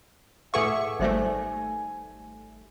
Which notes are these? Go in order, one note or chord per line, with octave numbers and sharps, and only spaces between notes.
A2 G#4 A4 B4 E5 F#5 C#6
G#1 G3 A3 D#4 C5 E5 G#5